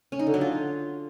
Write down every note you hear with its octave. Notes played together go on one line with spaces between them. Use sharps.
C#4
D#4
D3
F#3
F4